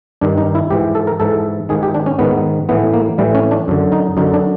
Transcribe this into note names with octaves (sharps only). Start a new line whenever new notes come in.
G2 D#3 D4
D#4
E4
G#2 E3 G4
A4
A#4
G#2 E3 A4
G#2 D#3 G#4
G4
D4
C#4
G#2 D#3 B3
A2 E3 B3
A#3
A2 E3 G3
C#4
D4
F#2 D3
D#4
F#2 D3 D#4
D4